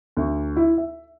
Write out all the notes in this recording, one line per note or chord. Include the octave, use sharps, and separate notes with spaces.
D2
E4
E5